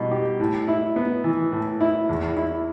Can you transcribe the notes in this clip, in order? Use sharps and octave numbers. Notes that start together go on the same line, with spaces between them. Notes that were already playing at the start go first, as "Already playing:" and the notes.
Already playing: B2 G3
G4
A2
E4
B3
E3
A2
E4
E2
E4